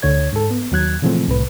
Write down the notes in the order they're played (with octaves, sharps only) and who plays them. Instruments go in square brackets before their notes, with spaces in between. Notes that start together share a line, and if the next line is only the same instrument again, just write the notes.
[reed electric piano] D2 D3 C#5 G#6
G#2 A4
B3
D#2 F#3 F#6 G#6
A#2 C#3 E3 F3 A3 C4
C2 A2 B4